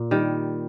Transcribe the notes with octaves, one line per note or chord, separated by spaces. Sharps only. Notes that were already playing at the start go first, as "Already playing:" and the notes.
Already playing: A#2
D#3 G3